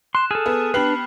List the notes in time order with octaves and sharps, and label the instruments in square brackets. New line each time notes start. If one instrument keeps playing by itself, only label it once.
[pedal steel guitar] C6 [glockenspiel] F#6 E7
[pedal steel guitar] G#4 A4 [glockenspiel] F6
[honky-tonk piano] B3
[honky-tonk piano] B3 G4 F#7 [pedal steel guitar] D4 B4 [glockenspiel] B5 F6 C7